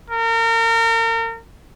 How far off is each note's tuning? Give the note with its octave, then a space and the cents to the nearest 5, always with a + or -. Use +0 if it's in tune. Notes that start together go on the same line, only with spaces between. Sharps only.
A#4 -35